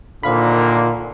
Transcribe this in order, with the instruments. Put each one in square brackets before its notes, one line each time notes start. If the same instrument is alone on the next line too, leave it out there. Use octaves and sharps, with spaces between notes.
[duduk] A#2 [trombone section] D3 D#3 A#3 [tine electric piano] C5 F5 B5